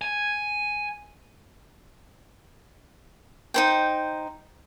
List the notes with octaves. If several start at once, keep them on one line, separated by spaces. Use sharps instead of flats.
G#5
D#4 C5 G5